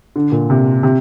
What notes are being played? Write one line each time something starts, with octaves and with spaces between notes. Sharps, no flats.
D3
A#2
C3
C3